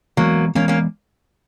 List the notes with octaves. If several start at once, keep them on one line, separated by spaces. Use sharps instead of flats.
E3 F#3 G#3 A#3 B3
E3 G#3 A#3 B3 C#4
A#3 C#4